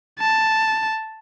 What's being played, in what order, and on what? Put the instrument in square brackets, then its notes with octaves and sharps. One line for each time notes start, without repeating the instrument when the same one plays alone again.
[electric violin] A5